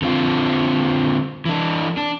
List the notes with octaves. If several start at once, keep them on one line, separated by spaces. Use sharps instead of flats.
D3 C4 F4
E3 D4
D4